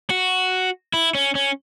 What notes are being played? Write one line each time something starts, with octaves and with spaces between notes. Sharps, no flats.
F#4
E4
C#4
C#4